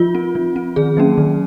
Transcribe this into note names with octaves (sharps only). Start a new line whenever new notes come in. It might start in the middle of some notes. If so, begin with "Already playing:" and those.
Already playing: F3 F4
C4
F3
C4
D#3 G#4
F#3 A#3 C#4
D#3